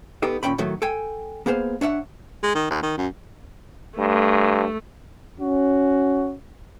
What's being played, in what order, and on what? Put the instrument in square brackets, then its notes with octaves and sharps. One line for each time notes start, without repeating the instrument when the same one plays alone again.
[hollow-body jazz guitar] B3 D#4 G4 A4
D#2 A#2 C#4 G5 B5
A2 D#3 F#3 A3
A4 G5 G#5
A#3 B3 G#4 C5 F5
D4 C#5 E5 F#5
[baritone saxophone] G#3
D#3
D#2
D#3
F#2
[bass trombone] G2 [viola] A3
[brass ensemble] C#4 F#4